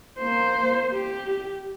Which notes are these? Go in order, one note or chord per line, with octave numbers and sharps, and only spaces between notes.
A#3 C5
G4